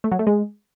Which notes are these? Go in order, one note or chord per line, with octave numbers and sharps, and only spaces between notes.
A3
F#3
A3
G#3